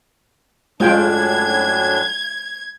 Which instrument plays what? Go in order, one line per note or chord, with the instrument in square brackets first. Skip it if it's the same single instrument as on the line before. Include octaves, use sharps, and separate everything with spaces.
[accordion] F#2 A2 D4 [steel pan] G#3 F4 G5 [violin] G#6